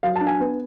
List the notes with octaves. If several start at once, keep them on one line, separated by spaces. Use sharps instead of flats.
F#3 F5
D4 A5
G#5
B3